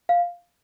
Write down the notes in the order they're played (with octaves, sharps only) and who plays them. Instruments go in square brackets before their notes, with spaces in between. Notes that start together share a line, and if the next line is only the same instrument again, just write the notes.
[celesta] F5